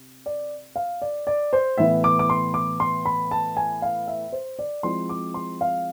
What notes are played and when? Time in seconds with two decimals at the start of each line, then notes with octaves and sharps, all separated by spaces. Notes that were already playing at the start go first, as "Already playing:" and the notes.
Already playing: C3
0.26 D5
0.76 F5
1.02 D5
1.27 D5
1.53 C5
1.78 A2 E3 B3 E4 E5
2.04 D6
2.19 D6
2.29 C6
2.54 D6
2.80 C6
3.06 B5
3.31 A5
3.57 G#5
3.82 F5
4.07 E5
4.32 C5
4.59 D5
4.83 F3 G#3 C4 E4 C6
5.09 D6
5.34 C6
5.61 F5